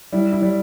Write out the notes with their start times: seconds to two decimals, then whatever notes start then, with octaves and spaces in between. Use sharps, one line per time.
0.12 G3 E4
0.32 E4
0.42 G3